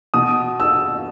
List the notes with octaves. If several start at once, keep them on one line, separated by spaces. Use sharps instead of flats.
B2 D#6
E6